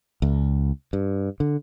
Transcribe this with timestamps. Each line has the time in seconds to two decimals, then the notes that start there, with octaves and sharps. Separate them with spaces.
0.22 C#2
0.93 G2
1.40 D3